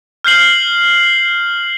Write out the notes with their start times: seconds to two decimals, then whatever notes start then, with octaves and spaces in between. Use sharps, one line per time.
0.24 F6 G6 C7 F#7